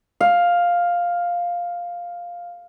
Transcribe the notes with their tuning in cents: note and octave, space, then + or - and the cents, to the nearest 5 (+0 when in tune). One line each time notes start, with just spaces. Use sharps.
F5 +5